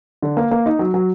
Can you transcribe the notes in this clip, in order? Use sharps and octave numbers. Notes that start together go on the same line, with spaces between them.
D3
A#3
A#3
D#4
F#3
F#3